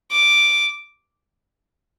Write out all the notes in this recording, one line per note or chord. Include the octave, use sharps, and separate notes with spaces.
D6